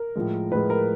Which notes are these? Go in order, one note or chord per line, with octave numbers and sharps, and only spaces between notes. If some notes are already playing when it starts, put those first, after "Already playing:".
Already playing: A#4
A2 F3 G#3
A2 F3 G#3 B4
A#4